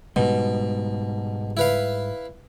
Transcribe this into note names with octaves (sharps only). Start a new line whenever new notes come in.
G#2 B2 G3
E4 B4 F5